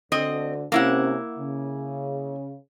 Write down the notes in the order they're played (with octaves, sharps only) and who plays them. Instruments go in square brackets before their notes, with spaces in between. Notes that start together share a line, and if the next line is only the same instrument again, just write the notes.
[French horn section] D2 D3 A4 [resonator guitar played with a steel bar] C4 D#5
[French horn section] C3 C#4 [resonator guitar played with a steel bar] A#3 E4 F#5
[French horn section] C#3